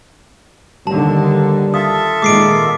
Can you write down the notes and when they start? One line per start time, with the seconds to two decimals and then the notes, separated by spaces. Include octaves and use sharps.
0.87 D#2 D3 G3 A5
1.74 F4 A4 E5 D#6
2.22 A#2 D#3 G#3 D6 C7 D7